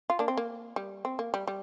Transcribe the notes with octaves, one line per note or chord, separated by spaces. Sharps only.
F4
A#3 D4
C4
A#3
G3
C4
A#3
G3
G3